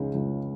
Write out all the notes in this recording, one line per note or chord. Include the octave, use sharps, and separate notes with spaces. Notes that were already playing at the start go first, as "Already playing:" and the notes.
Already playing: C#2 C#3 G#3 D#4
C#2